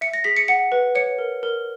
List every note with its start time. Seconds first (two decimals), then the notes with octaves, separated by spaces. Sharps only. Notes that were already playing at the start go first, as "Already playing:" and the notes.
0.01 E5 C#7
0.14 A#6
0.24 G#4 B6
0.37 C#7
0.48 F#5 C#7
0.72 B4
0.95 C#5 C#7
1.19 A#4
1.43 A#4